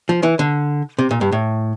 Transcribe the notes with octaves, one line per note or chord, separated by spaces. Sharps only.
F3
E3
D3
C3
A#2
G2
A2